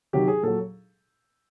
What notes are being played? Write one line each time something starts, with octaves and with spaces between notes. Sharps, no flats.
C3 D#3 F#3 G4
G#4
A#2 F#3 A4